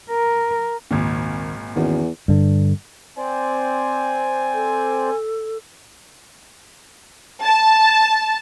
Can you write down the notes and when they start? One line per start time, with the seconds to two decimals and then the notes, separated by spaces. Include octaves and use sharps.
0.10 A#4
0.91 G#1 C#2 A#2 D#3
1.76 E2 D#3 C#4 F#4
2.28 G2 D3
3.18 C4 C5 D5 G#5
4.54 A4
7.45 A5